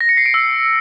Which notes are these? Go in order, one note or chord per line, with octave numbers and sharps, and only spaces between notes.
A#6
C#7
C7
D7
E6